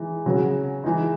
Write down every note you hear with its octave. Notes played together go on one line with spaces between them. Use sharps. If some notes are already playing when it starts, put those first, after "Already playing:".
Already playing: E3 G#3 D#4
C#3 F#3 C#4
E3 G#3 D#4